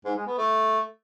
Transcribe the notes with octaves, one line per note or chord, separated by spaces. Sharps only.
G#2
G#3
B3
A3